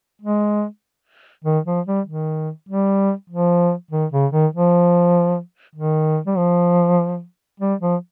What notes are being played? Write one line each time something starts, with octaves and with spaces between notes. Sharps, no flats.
G#3
D#3
F3
G3
D#3
G3
F3
D#3
C#3
D#3
F3
D#3
G3
F3
G3
F3